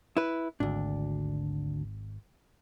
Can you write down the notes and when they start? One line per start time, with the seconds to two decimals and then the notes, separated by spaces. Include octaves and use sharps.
0.17 E4 B4
0.60 G#1 D2 D4